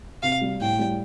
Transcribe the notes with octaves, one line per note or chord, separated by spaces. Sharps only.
C3 F5
G3
A2 G5
G3